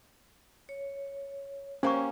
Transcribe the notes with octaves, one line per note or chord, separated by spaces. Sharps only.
C#5
A#3 C#4 G4 C5 C#6